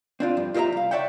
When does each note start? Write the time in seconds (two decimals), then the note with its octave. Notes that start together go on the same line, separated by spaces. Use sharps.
0.20 C4 D4 F4
0.37 G2 F3
0.54 F4 G4 A#4 D#5 E5 A#5
0.72 C2 F5
0.91 C#5 D5 E5 F#5 G5